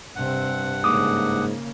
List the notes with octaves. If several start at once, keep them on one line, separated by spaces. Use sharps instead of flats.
G2 C3 C4 F#5
G#2 C#3 A#3 D6 D#6